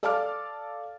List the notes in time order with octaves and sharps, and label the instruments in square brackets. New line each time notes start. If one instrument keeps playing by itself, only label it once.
[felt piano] A4 D5 F5 A5 D6 F6